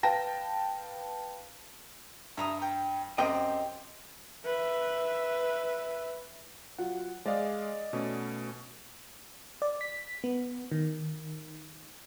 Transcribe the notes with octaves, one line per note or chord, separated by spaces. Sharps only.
B4 F5 G5 A5 A#6
G2 E5 A#5 D#6
G5
F#2 C4 G4 D#5 G5
B4 E5
F#3 F4 F#5
G#3 D5 D#5 F5
B2 A3 C#4
D5
B6
B3
D#3